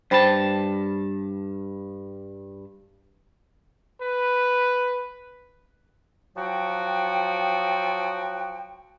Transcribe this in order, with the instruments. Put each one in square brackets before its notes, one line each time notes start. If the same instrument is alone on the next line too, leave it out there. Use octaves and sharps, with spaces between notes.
[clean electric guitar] G2 A5 [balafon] C5 G5 B5
[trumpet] B4
[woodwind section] F3 F#3 F#4 G5